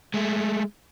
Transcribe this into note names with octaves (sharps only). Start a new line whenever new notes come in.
G#3 A3